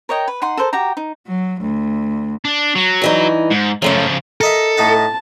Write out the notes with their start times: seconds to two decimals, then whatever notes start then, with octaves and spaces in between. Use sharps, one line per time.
0.09 A#4 C#5 D#5 G5
0.28 B4
0.42 D#4 F#5 C6
0.57 A4 A#4 C5
0.73 F#4 G4 G5 A#5
0.97 D#4
1.27 F#3
1.60 D2
2.45 D4
2.75 F#3
3.02 G2 E3 D#4
3.51 G#2
3.82 F#2 C#3 F3 A3 C#4
4.41 A4 A#4 D#5 E5
4.78 A2 D#4 F#5 A5